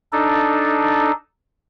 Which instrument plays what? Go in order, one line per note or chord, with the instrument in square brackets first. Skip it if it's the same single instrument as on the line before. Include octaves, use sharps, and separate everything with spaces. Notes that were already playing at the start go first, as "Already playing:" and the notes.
[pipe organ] D4 D#4 A4